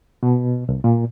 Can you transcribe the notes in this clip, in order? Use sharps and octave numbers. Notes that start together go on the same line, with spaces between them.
B2
C2
A#2